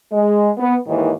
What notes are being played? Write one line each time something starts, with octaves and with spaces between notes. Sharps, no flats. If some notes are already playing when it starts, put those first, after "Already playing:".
G#3
B3
D#2 G#2 D#3 E3